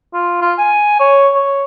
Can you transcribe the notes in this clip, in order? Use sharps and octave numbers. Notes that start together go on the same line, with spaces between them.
F4
F4
G#5
C#5
C#5